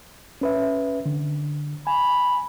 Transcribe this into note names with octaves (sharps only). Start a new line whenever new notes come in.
C#4 B4 E5
D3
G#5 B5